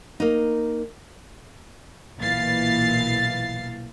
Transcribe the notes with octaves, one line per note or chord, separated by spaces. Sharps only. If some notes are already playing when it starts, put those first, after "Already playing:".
A#3 D#4
B1 A#2 E3 F5 A6 C7